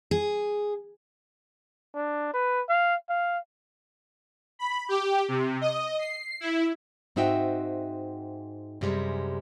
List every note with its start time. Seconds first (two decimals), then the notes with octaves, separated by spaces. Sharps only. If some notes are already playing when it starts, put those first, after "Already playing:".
0.11 G#4
1.95 D4
2.34 B4
2.69 F5
3.09 F5
4.59 B5
4.89 G4
5.28 C3
5.61 D#5
5.99 C7
6.41 E4
7.16 G#2 C4 D#4 F#4 E5 G5
8.81 F#2 C3 G3 G#3